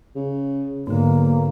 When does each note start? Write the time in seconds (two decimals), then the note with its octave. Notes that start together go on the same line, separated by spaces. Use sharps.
0.16 C#3
0.87 B1 G#2 D3 A#3